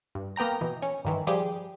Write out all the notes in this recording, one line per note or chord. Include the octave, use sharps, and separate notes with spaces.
G2
A#3 B3 G5 A#5 A#6
B2 E3
C#4
G2 D#3 E3
F3 G3 G4 G#4